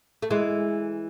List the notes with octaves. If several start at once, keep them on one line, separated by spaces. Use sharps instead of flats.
A3
E3 G#3